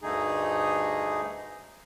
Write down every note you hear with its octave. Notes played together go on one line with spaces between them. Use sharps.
D2 G2 D3 A3 D#4 G#4